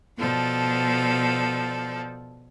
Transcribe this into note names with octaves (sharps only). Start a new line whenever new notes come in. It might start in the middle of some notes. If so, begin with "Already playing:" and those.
B2 F3 A4 D5